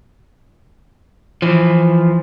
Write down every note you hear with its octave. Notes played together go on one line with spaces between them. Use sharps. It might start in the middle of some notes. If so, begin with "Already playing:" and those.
E3 F3